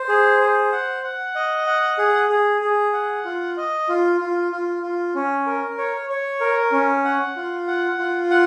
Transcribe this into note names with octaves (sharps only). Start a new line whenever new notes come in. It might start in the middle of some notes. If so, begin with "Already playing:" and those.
Already playing: C5
G#4
C5
F#5
F#5
D#5
F#5
G#4
G#4
G#4
F#5
F4
D#5
F4
F4
F4
F4
C#4
A#4
C#5
C#5
A#4
C#4
F#5
F4
F#5
F4
F#5